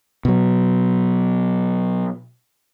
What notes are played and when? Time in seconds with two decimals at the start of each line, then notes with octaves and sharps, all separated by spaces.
0.25 B2 F#3